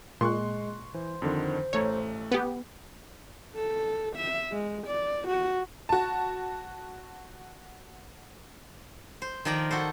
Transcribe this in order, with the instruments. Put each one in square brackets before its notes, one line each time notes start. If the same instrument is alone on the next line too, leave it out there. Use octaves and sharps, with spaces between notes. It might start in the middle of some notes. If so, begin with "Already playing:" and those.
[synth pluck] A#2 [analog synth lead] G#3 [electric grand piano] C6 C#6 F#6
[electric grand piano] E3 [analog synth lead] C5
[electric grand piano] F2 D3 D#3
[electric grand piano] A1 A3 A#5 [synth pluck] C#5
[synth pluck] B3 G4
[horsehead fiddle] A4
E5
G#3
D5
F#4
[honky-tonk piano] F#4 A5
[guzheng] C5
D#3 F3 A#4 D5 A#5
F#4 A4 C5